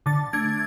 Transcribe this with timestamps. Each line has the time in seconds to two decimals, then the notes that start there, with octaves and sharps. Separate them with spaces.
0.06 D3 A6
0.33 A3 D4 G#6